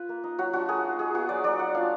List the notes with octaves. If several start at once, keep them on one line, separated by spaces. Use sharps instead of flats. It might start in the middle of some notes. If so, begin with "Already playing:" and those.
Already playing: F4 B4
A#3
D#4
F#3 F#4
D4 F4 F#4
A#3 G#4
D#4
G#3 G#4
B3 F4 F#4
F#3 D5
A#3 D#4 D5
A#3 F#5
D4 F4 F5